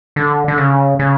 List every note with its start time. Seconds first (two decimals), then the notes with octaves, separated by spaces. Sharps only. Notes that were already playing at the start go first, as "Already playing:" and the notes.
0.16 D3
0.48 D3
0.58 C#3
0.99 C#3